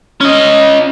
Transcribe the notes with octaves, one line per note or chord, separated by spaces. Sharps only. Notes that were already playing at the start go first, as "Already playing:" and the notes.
C#4 D#5